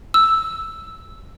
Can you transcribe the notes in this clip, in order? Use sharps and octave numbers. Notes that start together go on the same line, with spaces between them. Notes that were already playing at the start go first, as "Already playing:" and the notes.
E6